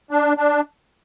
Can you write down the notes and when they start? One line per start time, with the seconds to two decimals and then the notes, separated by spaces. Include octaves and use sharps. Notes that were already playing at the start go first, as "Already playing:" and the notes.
0.11 D4
0.37 D4